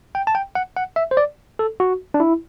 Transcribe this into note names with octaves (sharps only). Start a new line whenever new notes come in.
G5
A5
G5
F#5
F#5
E5
C5
D5
A4
F#4
D4
E4